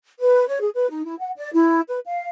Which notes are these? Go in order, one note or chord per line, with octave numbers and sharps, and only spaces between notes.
B4
C#5
G#4
B4
D#4
E4
F#5
D5
E4
B4
F5